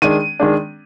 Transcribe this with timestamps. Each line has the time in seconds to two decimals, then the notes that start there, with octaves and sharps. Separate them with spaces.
0.02 D#3 G#3 D4 D#7
0.40 D#3 G#3 D4